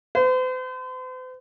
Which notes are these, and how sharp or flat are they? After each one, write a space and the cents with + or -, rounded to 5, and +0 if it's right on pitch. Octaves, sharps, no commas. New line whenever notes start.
C5 -45